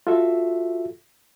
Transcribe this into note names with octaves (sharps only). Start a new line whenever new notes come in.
F4 F#4 A4 E5